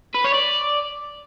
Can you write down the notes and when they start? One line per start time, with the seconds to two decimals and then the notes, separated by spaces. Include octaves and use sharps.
0.14 B4
0.24 C#5
0.34 D5